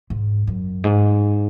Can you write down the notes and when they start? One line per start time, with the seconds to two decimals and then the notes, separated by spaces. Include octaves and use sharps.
0.10 G#2
0.47 F#2
0.84 G#2